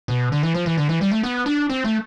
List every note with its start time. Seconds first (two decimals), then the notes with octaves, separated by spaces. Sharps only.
0.08 B2
0.32 D3
0.43 E3
0.54 F3
0.66 E3
0.77 D3
0.89 E3
1.01 G3
1.11 A3
1.23 B3
1.46 D4
1.70 C4
1.84 A3